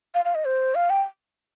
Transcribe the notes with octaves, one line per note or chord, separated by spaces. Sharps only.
F5
F5
D#5
C5
F5
G5